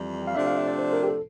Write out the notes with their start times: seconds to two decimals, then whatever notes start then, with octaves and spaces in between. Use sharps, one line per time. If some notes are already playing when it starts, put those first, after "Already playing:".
Already playing: F2 E3 G3
0.27 F5
0.35 C3 F3 A3 D4 E5
0.46 F5
0.57 E5
0.67 D5
0.79 C5
0.93 A#4
1.03 G4
1.07 A4